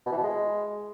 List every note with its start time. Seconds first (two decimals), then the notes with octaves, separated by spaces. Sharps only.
0.06 B2
0.12 E3
0.18 B2
0.23 G#3